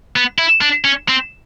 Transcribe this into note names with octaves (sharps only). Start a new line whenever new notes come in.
B3
E4
D4
C#4
C4